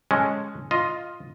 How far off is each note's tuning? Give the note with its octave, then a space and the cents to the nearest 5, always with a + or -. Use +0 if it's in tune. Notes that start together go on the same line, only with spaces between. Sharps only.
G#3 +0 C#4 +0 A4 +0
F4 +0 D#5 +10